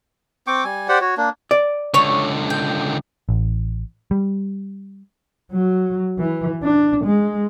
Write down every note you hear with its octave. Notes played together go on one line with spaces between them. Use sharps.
C4 G5 C#6 D6
G3 G#5
G4 C5 D5 F#5
F#4 C#5
A#3 D4
D5
C#2 D3 C#5 C#6
G5
A1
G3
F#3
E3
D4
G#3